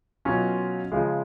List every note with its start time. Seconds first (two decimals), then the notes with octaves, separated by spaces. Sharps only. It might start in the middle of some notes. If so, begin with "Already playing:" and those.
0.25 B2 F#3 C#4 F4
0.92 C#3 F3 G#3